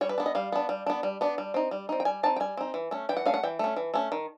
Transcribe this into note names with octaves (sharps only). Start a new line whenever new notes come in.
G3 C#5
B4
B3 D4
D#5
G3 F5
B3 D4
G3
B3 D4
G3
B3 D4
G3
C4 D#4
G3
C4 D#4
G5
G3 G#5
C4 D#4 A5
G5
G3 G#5
C4 D#4
E3
A3 C#4
E3 G5
F#5
A3 C#4 F5
F#5
E3 G5
A3 C#4
E3
A3 C#4
D#3